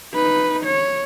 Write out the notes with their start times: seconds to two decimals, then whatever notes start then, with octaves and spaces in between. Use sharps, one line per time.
0.14 D#4 B4
0.65 C#5